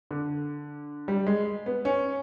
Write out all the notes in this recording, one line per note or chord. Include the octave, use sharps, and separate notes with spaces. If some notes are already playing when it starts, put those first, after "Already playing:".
D3
G3
G#3
B3
C#4